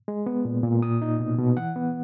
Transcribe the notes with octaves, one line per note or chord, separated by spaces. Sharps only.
G#3
B3
A#2
A#2
A#3 D#6
D#4
B2
B2
E3 F#5
B3